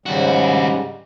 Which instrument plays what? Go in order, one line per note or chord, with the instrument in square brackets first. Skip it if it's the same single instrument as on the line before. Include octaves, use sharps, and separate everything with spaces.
[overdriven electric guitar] D#2 F#4 [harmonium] G#2 C#3 G3